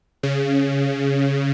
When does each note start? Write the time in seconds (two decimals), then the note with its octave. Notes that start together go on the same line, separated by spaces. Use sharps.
0.23 C#3